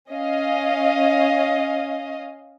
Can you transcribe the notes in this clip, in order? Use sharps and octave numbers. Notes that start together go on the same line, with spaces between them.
C#4 D#5 F5